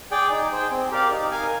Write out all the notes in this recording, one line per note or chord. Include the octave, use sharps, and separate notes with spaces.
G#4 D5 G5
D#4
G#4 C5 G5
C4
G4 A#4 D5 F5
D#4
A#4 F5 G#5